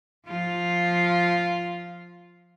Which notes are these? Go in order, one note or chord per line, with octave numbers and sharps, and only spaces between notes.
F3 F4